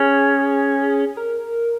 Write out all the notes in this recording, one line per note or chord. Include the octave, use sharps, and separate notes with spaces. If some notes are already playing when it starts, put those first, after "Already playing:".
Already playing: C#4 G#4
A#4